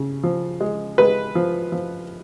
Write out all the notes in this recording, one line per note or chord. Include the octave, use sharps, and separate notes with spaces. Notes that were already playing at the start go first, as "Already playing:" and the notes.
Already playing: C#3
F3
G#3
G#3 B4
F3
F3